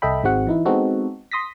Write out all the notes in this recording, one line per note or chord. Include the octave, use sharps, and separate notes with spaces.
C2 A4 D#5 E5 G5 B5
G#1 G#2 G#3 C4 F#4 F#5
E3 D#4 E4
G#3 B3 C4 D#4 F#4 A4
C6 D#6 A#6 B6